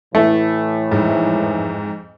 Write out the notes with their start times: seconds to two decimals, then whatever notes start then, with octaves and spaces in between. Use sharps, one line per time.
0.15 A2 E3 A3
0.92 F2 G#2